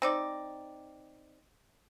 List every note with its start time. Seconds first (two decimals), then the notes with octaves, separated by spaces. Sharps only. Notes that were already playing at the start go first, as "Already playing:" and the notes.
0.02 C4 D#4 D5